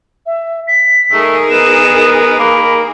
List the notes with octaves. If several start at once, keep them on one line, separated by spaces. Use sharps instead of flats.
E5
B6
A3 D#4 G#4 A#4
B3 E7
A#3 B5